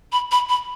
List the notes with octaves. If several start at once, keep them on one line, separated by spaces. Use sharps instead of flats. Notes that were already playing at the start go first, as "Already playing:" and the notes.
B5
B5
B5